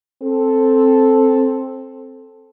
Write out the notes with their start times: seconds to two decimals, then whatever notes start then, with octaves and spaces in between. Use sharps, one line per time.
0.23 C4 A4